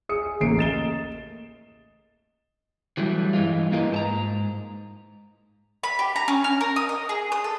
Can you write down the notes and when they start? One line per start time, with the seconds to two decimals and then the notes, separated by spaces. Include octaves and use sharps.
0.09 G#4 D#6 C#7
0.40 A1 A3 A#3 C7 D7
0.57 D#5 A6 E7 G7
2.97 E3 F#3 G3 A3
3.33 G2 E3 G#3 F4
3.72 A#3 E4 F4 A#4 B4 D#5
3.92 G#2 A5 A#5
5.83 B5
5.99 G4
6.16 A#5
6.28 C#4
6.44 F6
6.61 A#4
6.76 D#6
6.89 D#5
7.09 G#4
7.32 D#6
7.44 A4